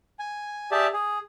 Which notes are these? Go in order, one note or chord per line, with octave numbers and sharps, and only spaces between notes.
G#5
G4 G#4 D5 E5 A5
G#4